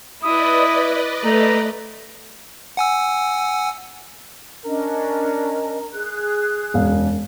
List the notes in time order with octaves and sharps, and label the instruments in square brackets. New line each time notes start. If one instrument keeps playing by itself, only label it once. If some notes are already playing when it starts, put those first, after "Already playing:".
[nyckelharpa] E4 [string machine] B4 D5 D#5 [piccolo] D#6
[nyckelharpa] A3 [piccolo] A#5
[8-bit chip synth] F#5 G#5 E6
[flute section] C#4 D4 D#5 [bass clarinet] A#4
[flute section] G#4 F#6
[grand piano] E1 F5 [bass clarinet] F#2